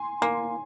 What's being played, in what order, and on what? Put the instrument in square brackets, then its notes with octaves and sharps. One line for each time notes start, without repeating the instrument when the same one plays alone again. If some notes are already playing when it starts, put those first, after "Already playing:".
Already playing: [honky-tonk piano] G#5 C6
[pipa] A#3 [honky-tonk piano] G#5 C6